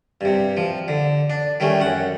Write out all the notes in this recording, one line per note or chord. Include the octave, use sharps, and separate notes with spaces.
G2 C3
F3
D3
D4
D#3 G3 A3 C#4
F#2 F#5